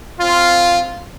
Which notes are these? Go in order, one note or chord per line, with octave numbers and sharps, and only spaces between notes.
C4 F4